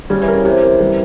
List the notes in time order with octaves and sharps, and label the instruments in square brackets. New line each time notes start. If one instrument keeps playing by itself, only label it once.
[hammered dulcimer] C#3 [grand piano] G3
[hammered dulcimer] E3
[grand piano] A#4
[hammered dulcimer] C#3
[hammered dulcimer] C3 [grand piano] G4
[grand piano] A#4
G3